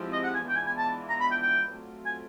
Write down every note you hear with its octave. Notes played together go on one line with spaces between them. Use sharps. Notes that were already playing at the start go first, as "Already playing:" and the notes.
Already playing: F3 G#3 C4 E4 G4
D#5
F#5
G#5
E3 G#3 B3 D4 F4 G5
G#5
G#5
A5
A#5
B5
G5
G5
F#3 A3 C4 F4
G#5